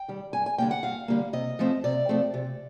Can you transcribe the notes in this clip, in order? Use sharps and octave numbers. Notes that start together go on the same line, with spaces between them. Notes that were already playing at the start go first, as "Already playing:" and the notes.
Already playing: G5
D#3 G3
G2 G#5
G#5
D3 G3 A#3 G5
F#5
G2 F5
D3 G3 A#3
C3 D#5
F3 A3 C4
C3 D5
F3 A3 C4
C3